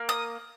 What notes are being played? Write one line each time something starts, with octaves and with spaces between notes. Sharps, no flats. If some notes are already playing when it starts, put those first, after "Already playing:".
Already playing: A#3
D#6